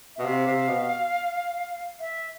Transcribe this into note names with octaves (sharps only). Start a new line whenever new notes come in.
B2 E5
C3 F5
C3
B2
E5